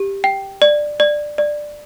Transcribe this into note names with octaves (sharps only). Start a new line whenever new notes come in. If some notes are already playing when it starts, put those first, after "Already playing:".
Already playing: G4
G5
D5
D5
D5